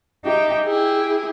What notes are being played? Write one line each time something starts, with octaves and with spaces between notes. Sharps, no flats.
D#4 G4 E5 G5
E4 G4 G#4